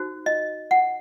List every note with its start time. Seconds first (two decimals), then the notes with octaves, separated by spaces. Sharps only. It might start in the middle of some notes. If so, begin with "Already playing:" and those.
Already playing: D#4 F#4 C5
0.26 D#5
0.71 F#5